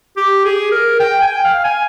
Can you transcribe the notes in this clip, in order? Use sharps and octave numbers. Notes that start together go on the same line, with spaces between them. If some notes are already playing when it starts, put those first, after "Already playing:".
G4
G#4
A#4
G5
G#5
G5
F5
G#5